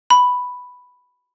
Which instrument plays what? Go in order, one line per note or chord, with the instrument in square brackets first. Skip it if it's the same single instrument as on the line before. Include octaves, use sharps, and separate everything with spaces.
[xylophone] B5